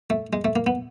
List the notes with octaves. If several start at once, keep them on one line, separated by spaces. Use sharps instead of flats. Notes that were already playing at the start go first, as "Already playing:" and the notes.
A3
G#3
A3
A#3
B3